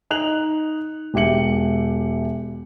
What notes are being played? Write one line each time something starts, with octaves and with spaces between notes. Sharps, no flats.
D#4 F#6 F7 F#7
E1 G4 E5 C#7 F#7